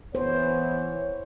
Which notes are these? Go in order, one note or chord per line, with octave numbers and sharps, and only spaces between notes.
E3 B3 C5 C#5